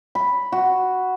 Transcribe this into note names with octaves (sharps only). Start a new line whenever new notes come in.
B5
F#4